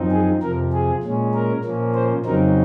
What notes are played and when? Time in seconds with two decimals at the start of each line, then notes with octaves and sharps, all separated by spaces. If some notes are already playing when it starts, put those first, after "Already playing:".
Already playing: F#2 F3 C4 D#4
0.12 G#4
0.42 F2 C3 F3 A#4
0.73 G#4
1.03 A#2 G#3 C#4
1.34 A#4
1.64 A#2 F3 A#3 C#4
1.95 C5
2.25 F2 C#3 F#3 C4 D#4 A#4